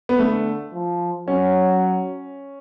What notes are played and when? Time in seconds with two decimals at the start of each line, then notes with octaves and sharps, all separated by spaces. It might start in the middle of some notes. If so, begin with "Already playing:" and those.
0.09 B3
0.19 D3 A3
0.73 F3
1.28 F#3 C#4